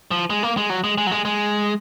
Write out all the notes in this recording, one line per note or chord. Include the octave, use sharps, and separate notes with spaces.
F3
G#3
A#3
G#3
F#3
G#3
G#3
F#3
G#3
G#3